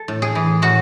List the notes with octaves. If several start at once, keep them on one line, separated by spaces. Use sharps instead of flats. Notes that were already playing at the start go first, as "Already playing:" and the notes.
Already playing: A4
A2
G#4
E3
A2 F#4